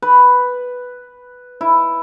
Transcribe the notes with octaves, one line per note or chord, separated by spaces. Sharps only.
B4
E4